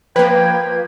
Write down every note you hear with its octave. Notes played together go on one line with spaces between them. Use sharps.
F3 A#3 B4 G5 G#6